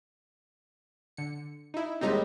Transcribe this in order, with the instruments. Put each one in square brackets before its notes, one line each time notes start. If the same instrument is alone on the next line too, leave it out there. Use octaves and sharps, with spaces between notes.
[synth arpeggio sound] D3 C#7
D#4 E4
[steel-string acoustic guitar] D#2 G3 G#3 [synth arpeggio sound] C4 D#4 A#5